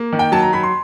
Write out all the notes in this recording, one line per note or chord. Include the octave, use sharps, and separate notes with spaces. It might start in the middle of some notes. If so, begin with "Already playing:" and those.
Already playing: A#3
D#3
G5
F#3 A5
A#5
F#3 B5
C6